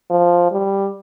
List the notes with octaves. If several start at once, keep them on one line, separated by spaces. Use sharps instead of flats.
F3
G3